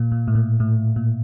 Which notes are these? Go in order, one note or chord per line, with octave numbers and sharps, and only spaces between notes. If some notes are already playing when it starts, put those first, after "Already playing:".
Already playing: A#2
A#2
A2
A#2
A2
A#2